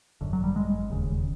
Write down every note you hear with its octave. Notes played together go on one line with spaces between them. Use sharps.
G#1 F#2 D3
F#3
G3
G#3
E1 D#2 C#3